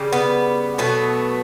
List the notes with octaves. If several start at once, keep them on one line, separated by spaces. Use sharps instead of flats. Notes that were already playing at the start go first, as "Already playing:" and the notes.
Already playing: C#3 G3
B3
B2 F#3 A3 B3